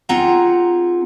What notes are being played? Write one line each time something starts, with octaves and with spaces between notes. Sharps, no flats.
C4 D#4 F4 G#4 F#5 A#5